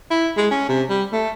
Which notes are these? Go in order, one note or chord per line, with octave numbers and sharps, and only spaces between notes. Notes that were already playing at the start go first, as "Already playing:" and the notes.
E4
G#3
C#4
C3
G3
A3